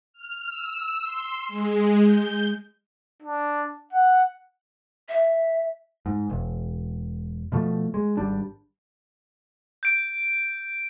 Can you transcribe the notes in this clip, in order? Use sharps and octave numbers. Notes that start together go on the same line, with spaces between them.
F6
E6
C6
G#3
G6
D4
F#5
E5
G#2
E1
B2 F3 A3
G#3
G#1 G3 D4
G6 D7